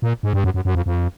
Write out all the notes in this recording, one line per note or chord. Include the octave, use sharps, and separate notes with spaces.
A#2
G#2
G2
F#2
F#2
F#2
F2
F2